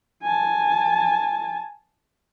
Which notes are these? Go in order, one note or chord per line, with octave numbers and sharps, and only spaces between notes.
G#5 A5